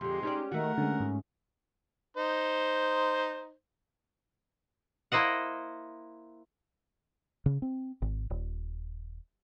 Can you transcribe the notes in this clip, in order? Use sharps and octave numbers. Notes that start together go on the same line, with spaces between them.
F2 D3 G#3 G4 C6
C#4 D#4 G4 D5
D#3 A3 F#4 A#4 F#5
D3 G#3 C#4
G#2
D#4 C5
A#3 E4 C5 D#5 F#5
C#3
C4
G#1
D#1